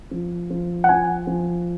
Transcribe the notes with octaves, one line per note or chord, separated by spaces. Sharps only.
F3
F3
F#5
F3 G#5
F3